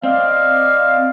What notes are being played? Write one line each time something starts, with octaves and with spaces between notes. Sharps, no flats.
C4 D5 D#5 F5